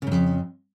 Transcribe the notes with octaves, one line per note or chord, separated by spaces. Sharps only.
F2 G#2 C#3